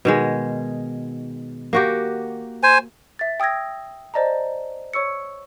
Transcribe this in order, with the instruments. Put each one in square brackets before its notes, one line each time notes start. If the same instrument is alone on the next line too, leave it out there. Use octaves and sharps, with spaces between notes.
[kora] B2 D#3 G#3
A#3 F#4 G4
[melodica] C5 G#5
[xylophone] E5 A6
G5 D#6 E6 G#6 A#6
C5 D5 D#5 A5 A#5
C#5 C#6 E6 C#7